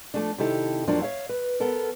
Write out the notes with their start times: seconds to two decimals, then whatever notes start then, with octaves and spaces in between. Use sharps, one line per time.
0.14 F3 A3 D4
0.38 C3 D#3 E4 G4 A4
0.87 F2 F3 F#3 A#3 D4
1.02 C#5 E5 F5
1.29 B4
1.60 B3 A4 A#4